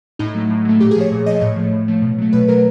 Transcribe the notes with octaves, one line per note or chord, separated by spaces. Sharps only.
A2 D#4
F#3 A3
A2
F#3 A3
A#2 G4
G#4
F3 A3 C#5
A#2
F3 A3 D#5
A2 C#5
F3 A3
A2
F3 A3
B2
F#3 A3
B2 B4
F#3 A3 A#4